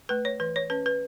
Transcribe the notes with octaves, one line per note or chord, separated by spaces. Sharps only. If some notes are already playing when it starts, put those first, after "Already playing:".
A3 B4
C#5
E3 B4
C#5
C#4 B4
B4